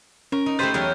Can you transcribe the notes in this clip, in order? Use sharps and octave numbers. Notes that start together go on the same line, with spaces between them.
C#4 A#4
D#4
A3 G4 B4 C5 B5 G6 A6 D#7
E2 F#3 G4 A#4 C#5